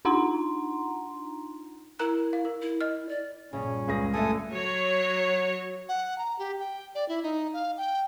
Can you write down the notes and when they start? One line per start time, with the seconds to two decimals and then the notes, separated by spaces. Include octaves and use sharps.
0.05 D4 D#4 F4 F#5 A#5 C6
1.99 E4 A#4 A#5 F#6
2.33 F5
2.45 A#4
2.62 E4
2.81 D#5 F6
3.09 D5
3.53 A#1 G2 A#2 C#3 C#4
3.87 C#2 G#4 A#6
4.13 D3 A3 A4 G#5 D#6
4.52 F#3 C#5
5.89 F#5
6.18 A#5
6.39 G4
6.60 G5
6.95 D5
7.09 E4
7.23 D#4
7.53 F5
7.77 G5